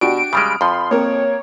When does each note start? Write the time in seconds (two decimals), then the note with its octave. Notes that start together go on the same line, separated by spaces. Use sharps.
0.01 B2 D4 F#4 G4 D7
0.33 C#3 G3 G#3 B5 D#6 F6
0.61 F2 F3 B5 C6
0.91 A#3 C4 A#4 C#5